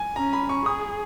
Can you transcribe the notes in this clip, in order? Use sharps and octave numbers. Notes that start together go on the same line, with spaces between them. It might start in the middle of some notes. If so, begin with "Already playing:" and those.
Already playing: G#5
C#4 A#5
B5
C#6
G#4 D#6